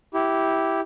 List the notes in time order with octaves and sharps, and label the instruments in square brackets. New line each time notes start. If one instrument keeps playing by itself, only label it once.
[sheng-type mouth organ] E4 G4